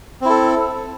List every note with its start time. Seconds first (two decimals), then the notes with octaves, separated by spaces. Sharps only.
0.21 C4
0.25 E4
0.30 A4